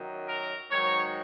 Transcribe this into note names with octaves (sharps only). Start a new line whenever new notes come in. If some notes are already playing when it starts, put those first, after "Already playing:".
Already playing: F#2 D#3 F#3
A#4
G#2 D#3 F#3 C#5